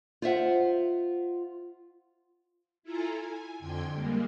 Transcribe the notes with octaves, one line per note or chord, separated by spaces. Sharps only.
F4 C5 E5 F#5
E4 F4 A4 G#5 A#5
G#5
F2 D3 G5 C6 G#6
G3 G#3 A#3